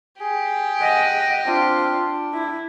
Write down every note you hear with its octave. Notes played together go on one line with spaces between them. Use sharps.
G4 G#4
D#5 F#5
C4 D4 F4
D4
E4